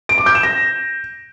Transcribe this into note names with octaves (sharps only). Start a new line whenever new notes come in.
D7
D6
G6
E7
A#6